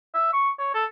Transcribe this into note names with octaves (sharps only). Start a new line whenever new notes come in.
E5
C#6
C#5
A4